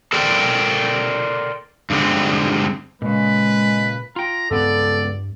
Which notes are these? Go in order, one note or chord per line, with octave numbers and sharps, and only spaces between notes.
A4 A#4 C5 D5 G5
G2 D3 G#3 C4
A#2 C#3 G#3 B4
F4 G5 A#5
C#2 G2 B3 C4 A4 D5